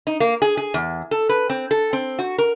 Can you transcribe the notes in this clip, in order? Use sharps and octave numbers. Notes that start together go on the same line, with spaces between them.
D#4
A#3
G#4
G#4
E2
A4
B4
C4
A4
C4
F#4
A#4